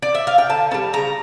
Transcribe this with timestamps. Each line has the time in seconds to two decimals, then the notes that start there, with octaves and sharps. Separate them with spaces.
0.02 D5
0.15 E5
0.27 F5
0.38 G5
0.50 D3 A5
0.71 G3 C#4 A5
0.93 C#3 A#5